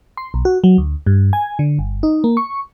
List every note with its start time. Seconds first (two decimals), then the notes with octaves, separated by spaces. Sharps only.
0.17 C6
0.34 B1
0.45 F#4
0.64 F#3
0.78 D2
1.06 G2
1.33 G#5
1.59 D3
1.79 G1
2.03 D#4
2.24 A#3
2.37 C#6